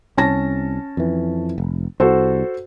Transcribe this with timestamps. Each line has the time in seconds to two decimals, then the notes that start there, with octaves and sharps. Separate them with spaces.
0.17 C2 C#4 A5 A#6
0.97 F2 E3
1.58 F1
2.00 C2 F#4 A4 C5